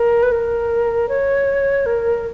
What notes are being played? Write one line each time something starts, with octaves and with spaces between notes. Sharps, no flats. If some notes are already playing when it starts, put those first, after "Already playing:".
Already playing: A#4
B4
A#4
C#5
A#4